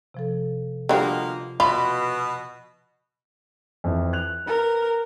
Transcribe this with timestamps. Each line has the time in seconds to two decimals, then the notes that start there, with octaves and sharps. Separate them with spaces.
0.14 C3 F3 A4
0.89 B2 D3 F3 G3 A#3 F4
1.60 B2 F4 B5 D6
3.84 F2 E3
4.13 F#6 F7
4.46 A#4 B4